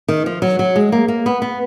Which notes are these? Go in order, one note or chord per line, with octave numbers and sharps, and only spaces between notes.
D#3
F3
F#3
F#3
G#3
A#3
A#3
B3
B3